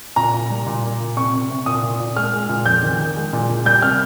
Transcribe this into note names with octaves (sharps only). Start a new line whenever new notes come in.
A#2 A#5
A#2
G3
A#2
A#2
A#2
C3 C#6
C3
C3
A#2 D#6
A#2
A#2
G#3 F6
G#3
A#2
F2 G6
D#3
D#3
G#3
A#2
A#2
G3 G6
C3 F6